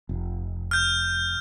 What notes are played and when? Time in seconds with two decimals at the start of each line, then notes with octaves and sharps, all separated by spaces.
0.09 F1
0.71 F6 G6